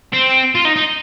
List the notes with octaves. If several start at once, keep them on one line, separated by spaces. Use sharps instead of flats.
C4
F4
D#4
D#4